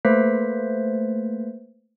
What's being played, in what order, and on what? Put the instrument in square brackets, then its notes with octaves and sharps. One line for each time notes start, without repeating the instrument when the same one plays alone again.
[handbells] A3 A#3 B4 C5 B6